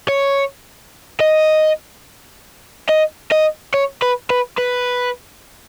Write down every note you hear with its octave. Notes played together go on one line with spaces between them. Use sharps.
C#5
D#5
D#5
D#5
C#5
B4
B4
B4